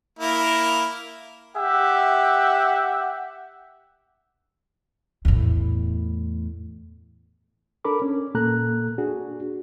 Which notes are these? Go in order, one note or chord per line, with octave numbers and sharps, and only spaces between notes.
A#3 E4 A#4
G4 E5 F#5
E2 A2
D4 A4 A#4 B5 D6
C#4
A#2 A#3 A4 A#5 F#6
D4 F#4 G#4